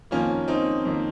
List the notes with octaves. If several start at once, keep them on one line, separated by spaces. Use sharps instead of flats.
F2 D#3 A#3 C#4 F4
C4 D#4
F2 D#3 A#3